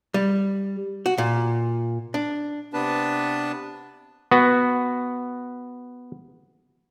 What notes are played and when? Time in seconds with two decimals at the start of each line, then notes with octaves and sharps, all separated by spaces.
0.14 G3
1.06 F#4
1.18 A#2
2.14 D4
2.73 C3 B3 D4 B4 A5
4.31 B3 F#4